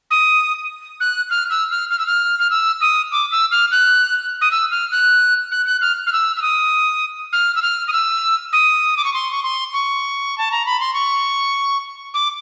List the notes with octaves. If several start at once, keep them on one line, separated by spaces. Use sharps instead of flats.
D#6
F#6
F6
E6
F6
F6
E6
F6
F6
E6
D#6
D6
E6
F6
F#6
D#6
E6
F6
F#6
F#6
F#6
F6
F6
E6
E6
D#6
F6
E6
F6
D#6
E6
D#6
D6
C#6
C6
C#6
C6
C#6
A5
A#5
B5
C6
C#6
D6